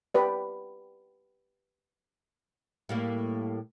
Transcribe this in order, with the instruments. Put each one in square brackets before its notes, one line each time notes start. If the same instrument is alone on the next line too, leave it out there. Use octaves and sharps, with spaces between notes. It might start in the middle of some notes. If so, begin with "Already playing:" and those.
[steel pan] G4 B4 D5
[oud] A2 G3 A#3